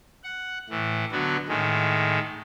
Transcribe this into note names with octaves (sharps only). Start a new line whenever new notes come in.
F#5
A2 E3
D3 F#3 B3 F#4
A2 D#3 G#3